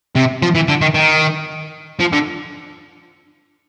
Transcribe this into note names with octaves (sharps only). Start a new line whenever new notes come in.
C3
F3
E3
D3
D#3
D#3
F3
D3